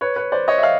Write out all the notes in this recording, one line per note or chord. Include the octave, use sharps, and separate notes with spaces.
B4 C#5
B4 C#5
C5 D5
C#5 D#5
E5
D#5 F5